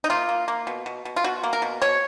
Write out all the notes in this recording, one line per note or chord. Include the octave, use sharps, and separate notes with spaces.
D#4
A#3 F4
A#3
A#3
B2
B2
B2
F4
B2 F#4
A#3
A#4
B2
B2 C#5